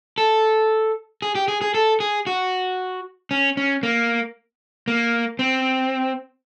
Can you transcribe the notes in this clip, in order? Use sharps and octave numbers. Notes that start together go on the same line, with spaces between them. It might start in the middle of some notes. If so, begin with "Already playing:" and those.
A4
G#4
G4
G#4
G#4
A4
G#4
F#4
C#4
C#4
A#3
A#3
C4